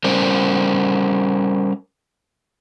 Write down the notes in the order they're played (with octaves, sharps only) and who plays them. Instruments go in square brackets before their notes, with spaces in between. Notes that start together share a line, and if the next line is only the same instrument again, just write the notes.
[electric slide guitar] G3 C#4 A#4 C5